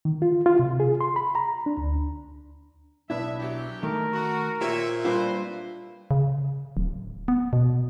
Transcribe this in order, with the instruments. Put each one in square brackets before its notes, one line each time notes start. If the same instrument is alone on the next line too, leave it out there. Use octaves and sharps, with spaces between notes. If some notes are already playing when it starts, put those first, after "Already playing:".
[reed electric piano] D#3
F4
F4
C3
G#4
C6
B5
A#5
D4
D2
[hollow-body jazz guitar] B1 D4 E4 [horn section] G2 B3 E5
[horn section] E3 F#3 G4
[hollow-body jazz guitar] D#3 A3 [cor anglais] A#4
[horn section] F#4
[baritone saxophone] A#2 [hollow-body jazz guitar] G4 C5 [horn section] C#5 E5
[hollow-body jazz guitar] G3 D4 F4 [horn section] A3 C4 C5 [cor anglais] B4
[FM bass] C#3
D1
B3
B2